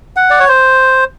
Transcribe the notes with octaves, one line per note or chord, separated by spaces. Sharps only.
F#5
D5
C#5
C5